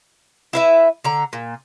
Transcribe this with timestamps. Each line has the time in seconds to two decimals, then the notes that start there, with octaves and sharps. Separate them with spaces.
0.53 E4 B4 E5
1.04 D3 A#5
1.33 A#2